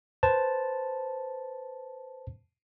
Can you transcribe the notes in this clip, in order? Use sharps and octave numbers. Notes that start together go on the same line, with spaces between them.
B4 C5 A5